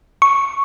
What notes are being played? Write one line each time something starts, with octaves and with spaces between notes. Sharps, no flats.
C#6